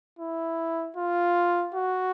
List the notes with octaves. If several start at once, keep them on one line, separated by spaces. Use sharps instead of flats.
E4
F4
F#4